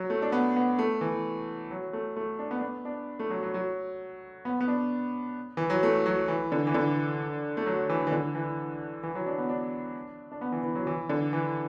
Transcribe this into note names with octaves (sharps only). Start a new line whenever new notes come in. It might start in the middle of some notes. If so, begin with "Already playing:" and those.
Already playing: F#3
A3
D4
B3
B3
A3
E3
F#3
A3
A3
D4
B3
D4
B3
D4
A3
F#3
F#3
F#3
B3
B3
D4
E3
F#3
A3
F#3
E3
D3
E3
D3
A3
F#3
E3
E3
D3
E3
E3
F#3
D4
B3
D4
D4
B3
E3
E3
F#3
E3
D3
E3